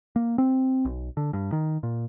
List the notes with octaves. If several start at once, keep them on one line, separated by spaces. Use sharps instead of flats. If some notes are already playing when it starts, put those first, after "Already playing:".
A#3
C4
B1
D3
G2
D#3
A#2